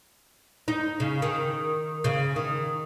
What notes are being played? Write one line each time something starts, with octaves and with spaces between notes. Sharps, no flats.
D#4
C#3
D#3
C#3
D#3